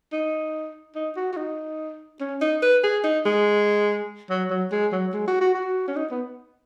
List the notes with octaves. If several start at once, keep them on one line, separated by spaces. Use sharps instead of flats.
D#4
D#4
F#4
F#4
D#4
C#4
D#4
B4
G#4
D#4
G#3
F#3
F#3
G#3
F#3
G#3
F#4
F#4
F#4
C#4
D#4
B3